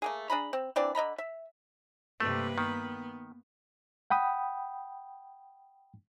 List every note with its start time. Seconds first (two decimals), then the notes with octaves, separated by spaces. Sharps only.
0.02 A3 A#3 G#4
0.30 D4 G#4 A#5 B5
0.53 C4
0.76 E3 C4 D4 D5
0.95 D3 D#5 A#5 B5
1.18 E5
2.20 G2 C3 A3 A#3 B4
2.58 D#3 B3
4.10 F#5 G5 B5 D#6